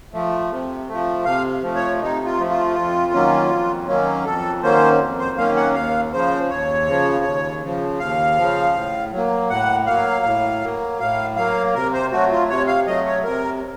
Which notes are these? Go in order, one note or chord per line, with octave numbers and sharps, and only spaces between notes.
F3 A3
C3
F3 A3
C3 F5
F3 A3
C#5
C3 D#4
F4
F3 A3
F4
F2
D#3 F#3 A#3 C#4
F2
D#3 F#3 A#3 C#4
F2 A4
D#3 F#3 A#3 C#4 C5
F2
C5
D#3 F#3 A#3 C#4 F5
F#5
D#2 F5
C#3 F3 C5
D#2 C#5
C#3 F3
D#2
C#3 F3
D#2 F5
C#3 F3
A2
F#3
A#3
A2 F#5
F#3 A#3 F5
A2
F#3 A#3
A2 F5
F#3 A#3 F5
C3 A#4
C5
F#3 A3 F#4
F4
C3 C#5
F5
F#3 A3 D#5
C#5
C3 A#4